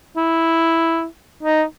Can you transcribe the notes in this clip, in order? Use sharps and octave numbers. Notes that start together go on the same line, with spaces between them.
E4
D#4